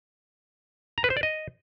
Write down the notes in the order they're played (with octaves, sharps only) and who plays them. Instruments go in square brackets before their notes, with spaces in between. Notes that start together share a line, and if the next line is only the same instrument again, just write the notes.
[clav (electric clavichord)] A#5
B4
C5
D5
D#5